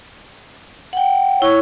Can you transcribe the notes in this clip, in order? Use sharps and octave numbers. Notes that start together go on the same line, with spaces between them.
F#5 G5
E4 C#5